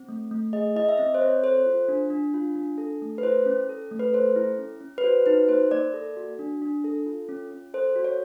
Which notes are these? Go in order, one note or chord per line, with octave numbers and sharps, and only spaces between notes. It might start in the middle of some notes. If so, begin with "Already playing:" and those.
Already playing: C4
A3
A3
G#4 D#5
E4 D#5
E5
C4 D#5
C5
C4 C#5
A4 C5
F4
D4
D4
F4
D4
A4
A3
B4
E4 C5
C#4
A4
A3
B4
A4 C5
E4
C#4
C#4
B4
F#4 C5
D#4 B4
A#3 C5
A#3 D5
A4
F#4
D4
D4
A4
F4
C#4
C#4
A4 C5
F#4
C#5